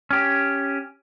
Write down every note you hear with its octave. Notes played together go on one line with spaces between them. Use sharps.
C#4 G4